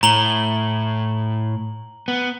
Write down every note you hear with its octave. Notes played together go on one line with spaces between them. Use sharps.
A2 A#5 F#7 G7
B3